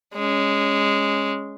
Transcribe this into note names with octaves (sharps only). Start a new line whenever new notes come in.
G#3 C#4